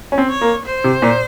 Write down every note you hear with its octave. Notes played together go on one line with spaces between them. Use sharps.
C#4
C4
C#5
A#3
C5
C3
A#2